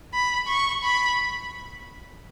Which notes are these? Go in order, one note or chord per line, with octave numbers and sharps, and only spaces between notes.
B5
C#6
B5